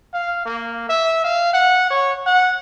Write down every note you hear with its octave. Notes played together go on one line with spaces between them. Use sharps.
F5
A#3
E5
F5
F#5
C#5
F#5